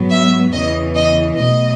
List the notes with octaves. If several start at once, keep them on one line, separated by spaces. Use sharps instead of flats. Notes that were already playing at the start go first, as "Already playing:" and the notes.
Already playing: G#2 F#3 B3
E5
E2 C#3 E3 D#5
D#5
B1 B2 A3 D#5